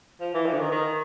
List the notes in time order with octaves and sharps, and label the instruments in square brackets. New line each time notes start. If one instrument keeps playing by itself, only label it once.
[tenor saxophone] F3
E3
F3
D3
D#3
D#3